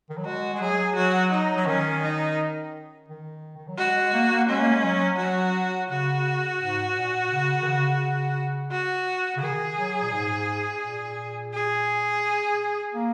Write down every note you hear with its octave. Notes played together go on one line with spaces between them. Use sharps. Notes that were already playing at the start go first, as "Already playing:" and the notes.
D#3
F#3
G#3 F#4
G#3
F#3 G#4
F#3 F#4
D#4
F#3
D#3 C#4
D#4
D#3
D#3
F#3
G#3 F#4
G#3
A#3
A#3
G#3 C#4
A#3
G#3
F#3
F#3 F#4
C#3 F#4
G#2
A#2
C#3
D#3
C#3
F#4
C#3
D#3 G#4
F#3
A#2
G#2
A#2
G#4
A#3